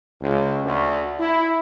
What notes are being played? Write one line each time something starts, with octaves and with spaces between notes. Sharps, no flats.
C#2
D2
E4